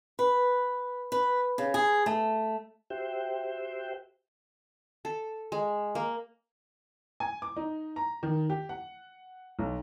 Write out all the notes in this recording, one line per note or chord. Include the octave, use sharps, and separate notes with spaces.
B4
B4
C#3
G#4
A3
F#4 G4 C5 E5 G5
A4
G#3
A#3
G#5
D6
D#4
A#5
D#3
G4
F#5
B1